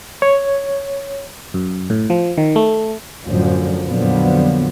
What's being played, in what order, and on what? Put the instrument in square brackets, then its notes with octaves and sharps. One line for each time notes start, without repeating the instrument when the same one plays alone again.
[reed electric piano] C#5
[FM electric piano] F#2
A2
F3
D#3
A3
[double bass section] F#2 A2 D3 F3
F2 A#2 D3 F3 F#3 B3